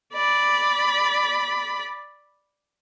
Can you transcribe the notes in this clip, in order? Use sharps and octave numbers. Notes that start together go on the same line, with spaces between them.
D5 B5